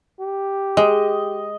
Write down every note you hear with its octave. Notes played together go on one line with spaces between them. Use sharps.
G4
G#3 D#5